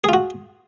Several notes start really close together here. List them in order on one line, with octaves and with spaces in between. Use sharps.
G#4 F4 F#4